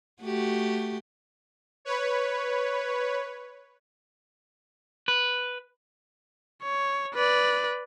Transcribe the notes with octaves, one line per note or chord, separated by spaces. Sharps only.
A3 F#4 G4
B4 C#5
B4
C#5
B4 D5